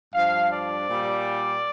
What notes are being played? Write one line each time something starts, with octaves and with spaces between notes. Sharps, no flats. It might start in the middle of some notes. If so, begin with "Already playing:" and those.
G2 F3 F5
D5
A#2 G3